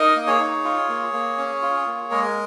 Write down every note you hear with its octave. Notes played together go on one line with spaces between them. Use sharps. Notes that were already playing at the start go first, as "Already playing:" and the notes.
Already playing: D#4 A#4 D#5
A#3
G#4 C#5
D#4
F4
A#3
A#3
C#4
F4
A#3
G#3 A#4